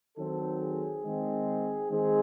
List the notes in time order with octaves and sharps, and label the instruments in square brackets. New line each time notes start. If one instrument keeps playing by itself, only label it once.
[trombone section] D#3 F#3 C4 A4
G#4
D#3 G#3 C4
D#3 G#3 C4 G#4